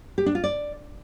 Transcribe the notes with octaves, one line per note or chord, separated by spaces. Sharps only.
G4
D4
F4
D5